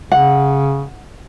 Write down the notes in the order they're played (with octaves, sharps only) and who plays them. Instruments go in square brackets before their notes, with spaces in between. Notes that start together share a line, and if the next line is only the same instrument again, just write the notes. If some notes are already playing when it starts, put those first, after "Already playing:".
[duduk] C#3 [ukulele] F#5